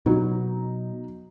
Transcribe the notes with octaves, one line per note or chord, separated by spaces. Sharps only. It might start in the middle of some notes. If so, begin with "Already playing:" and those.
B2 F#3 D#4 F#4